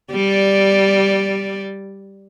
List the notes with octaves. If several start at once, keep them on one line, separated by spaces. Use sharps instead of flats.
G3 D5